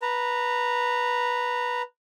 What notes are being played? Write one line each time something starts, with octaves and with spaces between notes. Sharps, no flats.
B4 A#5